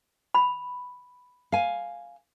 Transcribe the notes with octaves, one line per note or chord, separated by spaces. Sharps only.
B5
F5 G#5